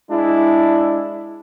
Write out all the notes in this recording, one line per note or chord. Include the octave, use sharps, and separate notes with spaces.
G#3 D4 E4